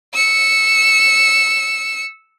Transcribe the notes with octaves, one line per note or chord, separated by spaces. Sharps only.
E6 C#7